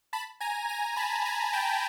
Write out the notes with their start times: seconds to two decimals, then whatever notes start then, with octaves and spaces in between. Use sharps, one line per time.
0.13 A5 B5
0.40 G#5 A#5
0.69 G#5 A#5
0.97 A5 B5
1.25 G#5 A#5
1.53 G5 A5